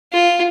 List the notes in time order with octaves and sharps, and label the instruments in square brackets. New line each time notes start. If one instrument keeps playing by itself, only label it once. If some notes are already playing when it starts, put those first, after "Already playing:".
[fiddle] F4